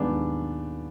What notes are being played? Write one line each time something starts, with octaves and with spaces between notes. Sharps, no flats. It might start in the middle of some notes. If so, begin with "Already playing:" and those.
Already playing: D#2 D#3 G#3 B3 D4
D#2